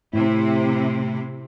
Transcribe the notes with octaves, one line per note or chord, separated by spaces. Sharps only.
A2 C3 C4 E4